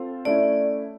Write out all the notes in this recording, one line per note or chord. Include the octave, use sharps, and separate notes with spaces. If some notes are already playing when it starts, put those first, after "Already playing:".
Already playing: C4 F4 A4 C5
A3 C#4 E4 D5